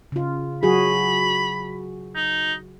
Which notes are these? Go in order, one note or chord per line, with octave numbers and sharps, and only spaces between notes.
C#3 F4
F#3 F#4 G#4 B5
D#4